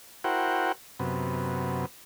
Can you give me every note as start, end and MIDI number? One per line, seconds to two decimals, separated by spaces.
0.24 0.72 64
0.24 0.72 66
0.24 0.72 70
0.24 0.72 72
0.24 0.72 78
0.24 0.72 79
1.00 1.86 42
1.00 1.86 48
1.00 1.86 59